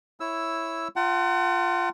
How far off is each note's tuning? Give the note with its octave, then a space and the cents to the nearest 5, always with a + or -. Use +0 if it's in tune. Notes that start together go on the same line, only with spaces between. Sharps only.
E4 +0 C#5 -10 E6 +0
F4 +0 F#5 +35 A5 +40